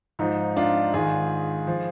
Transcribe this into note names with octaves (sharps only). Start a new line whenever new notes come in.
G#2 F3 D#4
D4 F4
G#2 D#3 F4 G#4
F3